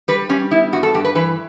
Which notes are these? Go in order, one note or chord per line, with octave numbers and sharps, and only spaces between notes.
G3 B4
G3 C#4
B3 E4
G2 F#4
A4
G2 G4
B4
E3 B4